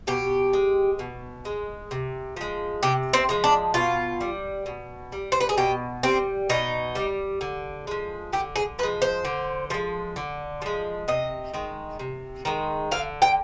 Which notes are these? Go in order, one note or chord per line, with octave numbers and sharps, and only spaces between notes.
B2 G4
G#3
B2
G#3
C3
F3 G#3
C3 G4
C4
F3 G#3
D4
B2 F4
G3
B2
G3
C5
B4
G#4
B2 G4
G3 C4
B2 D#4
G3
D3
F3 G#3
D3 G4
G#4
F3 G#3 B4
C5
D3
F3 G#3
D3
F3 G#3
C3 D#5
D#3 G#3
C3
D#3 G#3
D3 F5
G5